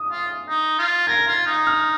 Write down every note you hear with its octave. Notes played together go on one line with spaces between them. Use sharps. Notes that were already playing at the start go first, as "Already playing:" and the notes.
Already playing: D#6
F4
D#4
F4
A#4 G#6
F4
D#4
F6